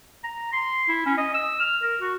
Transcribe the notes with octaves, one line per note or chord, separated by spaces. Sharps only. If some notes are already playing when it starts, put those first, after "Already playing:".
A#5
C6
E4
C#4
D#5
E6
F6
A#4
F#4